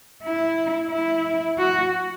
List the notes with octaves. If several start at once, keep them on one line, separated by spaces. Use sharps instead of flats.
E4
E4
F#4